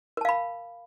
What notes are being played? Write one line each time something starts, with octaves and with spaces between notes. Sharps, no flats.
A#4 F5 A5 B5